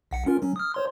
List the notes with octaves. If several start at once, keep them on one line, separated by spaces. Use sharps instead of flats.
B1 F#5 C#7
C#4 F4 A#4
F#3 C#4
D#6 F6
C5 C#5 C6